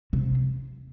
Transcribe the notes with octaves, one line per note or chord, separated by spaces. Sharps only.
C3